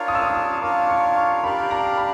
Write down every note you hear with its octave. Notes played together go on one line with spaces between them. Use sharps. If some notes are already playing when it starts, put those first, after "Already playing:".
Already playing: D4 F4 A#4 C#5 F5
D#6
E6
D#6
D#6
D4 F4 A#4 C#5 F5 D6
C#6
C#6
D4 G4 A#4 D5 F5 B5
A#5
B5